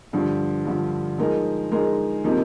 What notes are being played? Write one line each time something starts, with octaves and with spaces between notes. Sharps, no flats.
G2 D3 F3
G2 D3 F3
F3 G#3 D#4 A#4
F3 G#3 D#4 A#4
C3 F3 A#3 D#4